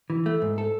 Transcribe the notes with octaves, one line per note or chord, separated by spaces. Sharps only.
E3
A3
G#2
A4